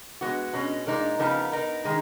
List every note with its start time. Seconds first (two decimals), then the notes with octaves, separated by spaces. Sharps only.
0.21 G#3 B3 F#4
0.53 B2 G#3 C#4
0.87 A#2 F3 G#3 D#4 A#4
1.19 C#3 F3 B3 D#4 A#4
1.52 B3 D#4 A#4
1.84 D#3 G#3 D#4